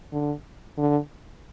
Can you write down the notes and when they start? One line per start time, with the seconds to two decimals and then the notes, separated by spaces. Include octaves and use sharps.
0.13 D3
0.78 D3